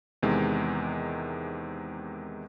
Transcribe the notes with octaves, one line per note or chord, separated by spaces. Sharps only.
E2 C3 D#3 G#3